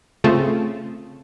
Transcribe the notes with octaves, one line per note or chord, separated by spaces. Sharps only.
C#3 A3 C4 F4 A4